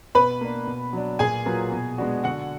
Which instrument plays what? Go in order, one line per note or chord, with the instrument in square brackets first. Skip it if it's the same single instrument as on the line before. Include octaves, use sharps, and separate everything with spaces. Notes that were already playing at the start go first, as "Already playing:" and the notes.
[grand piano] B2 [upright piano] B4 B5
[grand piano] A#3 D4
B2
F#3 D4
[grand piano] A#2 [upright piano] G#4 G#5
[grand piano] F#3 A#3 F4 B4
B2
G#3 B3 D4 F#4
[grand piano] D3 [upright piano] F#4 F#5